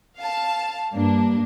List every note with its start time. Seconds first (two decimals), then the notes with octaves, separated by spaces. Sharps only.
0.17 F5 A5
0.93 G2 A#3 D4